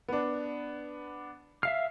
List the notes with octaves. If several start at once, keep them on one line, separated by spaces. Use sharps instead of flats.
B3 D4
E5 F5 F6 C7